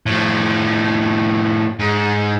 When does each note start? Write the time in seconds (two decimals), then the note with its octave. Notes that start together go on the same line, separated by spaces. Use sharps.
0.06 A2 F3
1.79 G#2